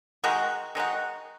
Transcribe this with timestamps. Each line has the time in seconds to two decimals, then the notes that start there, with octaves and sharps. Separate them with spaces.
0.24 D#3 G#3 D#4 F#4
0.75 D#3 G#3 D#4 F#4